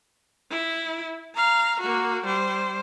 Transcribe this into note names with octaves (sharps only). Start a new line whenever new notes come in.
E4
F5 A#5
A#3 F#4
G3 C5